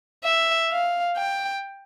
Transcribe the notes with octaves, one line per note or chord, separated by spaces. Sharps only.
E5
F5
G5